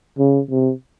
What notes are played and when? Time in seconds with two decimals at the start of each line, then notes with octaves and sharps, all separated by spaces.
0.19 C#3
0.50 C3